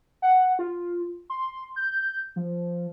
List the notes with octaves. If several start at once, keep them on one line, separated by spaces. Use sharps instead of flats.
F#5
F4
C6
G6
F3